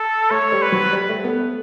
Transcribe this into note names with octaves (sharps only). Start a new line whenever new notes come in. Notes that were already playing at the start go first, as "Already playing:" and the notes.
Already playing: A4
A3 C#5
G3
B4
F#3
G3
A3
B3
A3